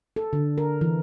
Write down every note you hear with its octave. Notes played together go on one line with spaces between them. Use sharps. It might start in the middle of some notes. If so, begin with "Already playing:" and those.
A4
D3
A#4
E3